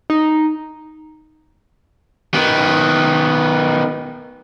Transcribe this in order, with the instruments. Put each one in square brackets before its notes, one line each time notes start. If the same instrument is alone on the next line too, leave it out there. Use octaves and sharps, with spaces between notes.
[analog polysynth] D#4
[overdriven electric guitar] D#3 B3